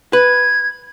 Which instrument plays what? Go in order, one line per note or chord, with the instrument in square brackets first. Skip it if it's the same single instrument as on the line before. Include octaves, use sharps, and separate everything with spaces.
[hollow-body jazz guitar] B4 [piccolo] G#6